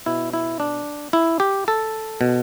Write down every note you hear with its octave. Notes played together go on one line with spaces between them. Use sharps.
B2 E4
E4
D4
E4
G4
A4
B2